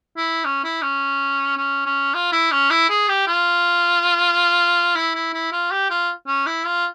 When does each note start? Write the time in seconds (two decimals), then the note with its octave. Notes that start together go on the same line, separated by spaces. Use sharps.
0.17 E4
0.45 C#4
0.64 E4
0.82 C#4
1.57 C#4
1.86 C#4
2.14 F4
2.32 E4
2.52 C#4
2.70 E4
2.89 G#4
3.08 G4
3.27 F4
4.95 E4
5.15 E4
5.33 E4
5.52 F4
5.71 G4
5.90 F4
6.27 C#4
6.46 E4
6.66 F4